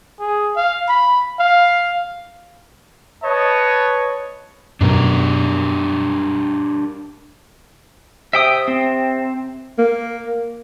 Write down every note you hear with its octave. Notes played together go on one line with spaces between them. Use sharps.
G#4
F5
B5
F5
B4 C#5 D#5 A5
F#2 B2 D4 G4 A#4
C3 E5 G5 D#6
C4
A#3